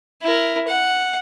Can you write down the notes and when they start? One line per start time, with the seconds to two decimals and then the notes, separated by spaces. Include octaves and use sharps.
0.22 E4 A#4
0.67 F#5